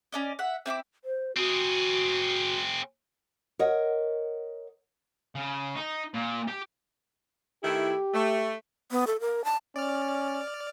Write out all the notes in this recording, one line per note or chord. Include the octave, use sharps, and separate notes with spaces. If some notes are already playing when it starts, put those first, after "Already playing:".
C#4 D5 D#5
E5 F#5
C4 E4 C6 D6
C5
C4 F#4 G#4
A#4 C#5 D#5 F#5
C#3
D#4
A#2
G4
D#3 A3 E4 G4
A3
B3
A4
A#4
A5
C#4 D5 F6